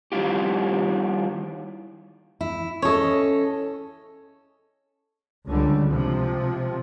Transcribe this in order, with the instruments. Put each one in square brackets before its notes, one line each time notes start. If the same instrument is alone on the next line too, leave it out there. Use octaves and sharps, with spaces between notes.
[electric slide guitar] D#3 G3 B3 E4 F4 G4
[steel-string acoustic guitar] E4
[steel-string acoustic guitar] C#4 A4 [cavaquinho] C#5 D#5
[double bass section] C#2 D3 G3
C3 F3